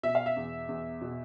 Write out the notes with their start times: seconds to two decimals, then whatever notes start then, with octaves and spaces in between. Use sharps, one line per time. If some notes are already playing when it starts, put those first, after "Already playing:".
0.03 B2 E5
0.15 F5
0.26 E5
0.36 E2
0.69 E2
1.02 B2